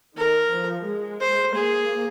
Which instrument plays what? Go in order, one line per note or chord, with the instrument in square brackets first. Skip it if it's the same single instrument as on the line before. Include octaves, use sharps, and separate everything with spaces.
[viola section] D#3 [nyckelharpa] A#4
[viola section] F3
G#3
[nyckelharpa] C5
[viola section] A#3 [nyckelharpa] G#4